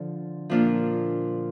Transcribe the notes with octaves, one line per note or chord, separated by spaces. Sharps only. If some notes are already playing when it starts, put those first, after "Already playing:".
Already playing: D3 F3 F4
A#2 F3 A#3 D4 F4